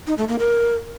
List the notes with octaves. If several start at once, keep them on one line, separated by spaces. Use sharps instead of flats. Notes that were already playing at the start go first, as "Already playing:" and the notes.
D#4
A3
A#3
A#4